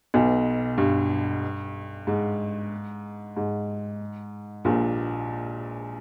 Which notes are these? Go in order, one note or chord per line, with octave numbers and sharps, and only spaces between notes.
B1 B2
G2
G#2
G#2
A#1 A#2